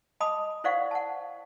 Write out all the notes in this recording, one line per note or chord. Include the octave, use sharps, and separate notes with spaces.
D#5 A5 B5 D6 D#6
E4 C5 D5 F5 F#5 C#6
F#5 A5